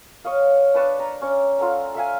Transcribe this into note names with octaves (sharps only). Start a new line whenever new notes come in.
C#5 D#5 F5
D4 B4 A5 C#6
A#5
C#4 D5
F4 A4 F#5 A#5
A4 E5 F5 G#5